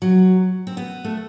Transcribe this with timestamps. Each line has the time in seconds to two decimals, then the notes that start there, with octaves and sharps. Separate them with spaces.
0.02 F#3
0.67 C4
0.77 B3
1.04 A3